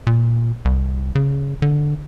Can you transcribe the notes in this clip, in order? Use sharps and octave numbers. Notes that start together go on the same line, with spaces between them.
A#2
C2
C#3
D3